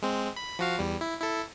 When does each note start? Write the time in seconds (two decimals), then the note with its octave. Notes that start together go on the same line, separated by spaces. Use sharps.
0.02 G#3 C4
0.36 B5
0.59 F3 F#4 F5
0.79 E2 G3
1.01 E4
1.20 E4 A4